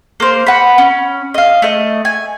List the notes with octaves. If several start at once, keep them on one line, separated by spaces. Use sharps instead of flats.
A#3 C5
F#5 B5
C#4
D#5 F5
A3 D#5
G#5